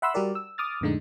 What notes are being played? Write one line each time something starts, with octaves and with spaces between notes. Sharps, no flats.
E5 F#5 B5 C6 E6
G3 F#4 G4 A#4 D5
E6
D6 D#6 F6 A6
F2 A2 D3 G#3 D#4